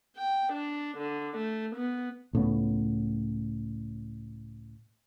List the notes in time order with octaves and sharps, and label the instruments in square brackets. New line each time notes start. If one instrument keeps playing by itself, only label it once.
[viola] G5
D4
D3
A3
B3
[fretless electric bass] C#2 A2 C#3 B3